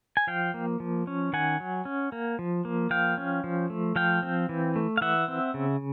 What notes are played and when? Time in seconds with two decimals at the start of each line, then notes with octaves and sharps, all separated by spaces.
0.17 G#5
0.27 F3 F5 G5
0.54 A#3
0.80 F3
1.07 C#4
1.33 D#3 F#5 G#5
1.60 F#3
1.85 C#4
2.12 A#3
2.39 F3
2.65 A#3
2.90 F3 F5 G5
3.18 C#4
3.44 F3
3.70 A3
3.96 F3 F5 G5
4.23 C4
4.49 E3
4.76 A3
4.97 F5
5.01 E3 E5 F#5
5.28 C4
5.54 C#3